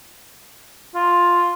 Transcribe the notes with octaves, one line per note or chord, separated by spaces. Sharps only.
F4